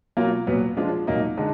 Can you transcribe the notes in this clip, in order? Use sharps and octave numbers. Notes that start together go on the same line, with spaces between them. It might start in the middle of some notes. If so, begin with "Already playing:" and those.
B2 F#3 A#3 F4
A#2 F#3 B3
F3 G#3 D4 F4
A#2 F#3 A#3 D#4
D3 G#3 D#4